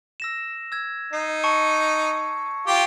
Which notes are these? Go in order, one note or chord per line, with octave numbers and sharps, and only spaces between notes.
E6 A#6 E7
E6 G#6
D#4 C7
A5 C#6 C#7
F4 G4